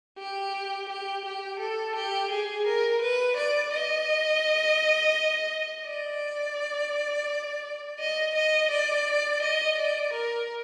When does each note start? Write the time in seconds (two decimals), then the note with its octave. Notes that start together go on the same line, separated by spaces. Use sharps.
0.18 G4
0.89 G4
1.25 G4
1.60 A4
1.96 G4
2.31 G#4
2.67 A#4
3.02 B4
3.37 D5
3.74 D#5
5.86 D5
8.00 D#5
8.35 D#5
8.71 D5
9.42 D#5
9.77 D5
10.13 A#4